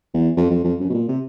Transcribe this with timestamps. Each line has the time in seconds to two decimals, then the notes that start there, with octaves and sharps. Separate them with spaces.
0.14 E2
0.37 F2
0.50 F2
0.64 F2
0.80 F#2
0.90 B2
0.94 A#2
1.08 C3